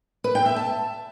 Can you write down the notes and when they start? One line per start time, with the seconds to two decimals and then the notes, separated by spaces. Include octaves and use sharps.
0.24 B4
0.35 G5
0.46 E5
0.56 A5